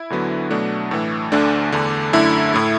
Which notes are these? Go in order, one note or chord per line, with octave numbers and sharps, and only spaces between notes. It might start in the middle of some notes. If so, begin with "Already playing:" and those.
Already playing: E4
D2 D3 F#3 B3
B2 F#3 A3 D4
A2 E3 A3
D2 D3 A3 D4
E2 D3 A3
F#2 D3 A3 E4
A2 A3